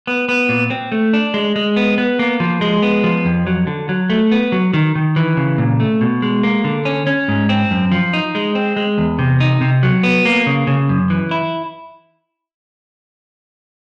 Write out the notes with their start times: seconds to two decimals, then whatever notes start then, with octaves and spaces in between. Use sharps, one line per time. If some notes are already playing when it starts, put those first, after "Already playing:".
0.07 B3
0.29 B3
0.49 A#2
0.70 C4
0.92 A3
1.13 D4
1.34 G#3
1.56 G#3
1.76 B3
1.98 B3
2.19 A#3
2.40 F3
2.61 G#3
2.82 B3
3.04 F3
3.25 F2
3.47 F#3
3.67 D3
3.89 F#3
4.10 A3
4.31 B3
4.52 F#3
4.73 D#3
4.95 D#3
5.16 E3
5.37 C#3
5.58 A#2
5.80 A3
6.01 B2
6.22 G#3
6.43 A#3
6.64 D3
6.85 C#4
7.07 C#4
7.28 G#2
7.49 C4
7.71 F#2
7.92 F3
8.13 D#4
8.35 G#3
8.55 C4
8.76 G#3
8.98 E2
9.19 C3
9.40 D#4
9.61 C3
9.83 F#3
10.03 B3
10.25 A#3
10.46 C#3
10.67 C#3
10.89 F#2
11.10 E3
11.31 E4